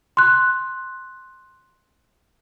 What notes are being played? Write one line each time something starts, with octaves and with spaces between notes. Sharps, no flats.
C6 F#6